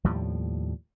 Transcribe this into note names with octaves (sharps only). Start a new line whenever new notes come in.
D#2 A2 F3 G3